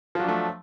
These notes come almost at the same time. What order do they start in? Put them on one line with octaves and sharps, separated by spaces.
F3 F#3 D4 A3